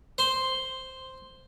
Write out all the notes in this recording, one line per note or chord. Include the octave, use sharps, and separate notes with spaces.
C5 C6